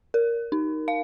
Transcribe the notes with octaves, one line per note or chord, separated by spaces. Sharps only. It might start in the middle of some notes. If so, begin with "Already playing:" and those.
A#4
D#4
F5